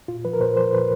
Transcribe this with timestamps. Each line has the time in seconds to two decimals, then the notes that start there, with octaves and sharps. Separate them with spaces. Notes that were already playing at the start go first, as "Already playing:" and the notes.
0.08 A#2 F4
0.25 F3 B4
0.33 A#4
0.40 A#2 C5
0.57 F3 C5
0.73 A#2 B4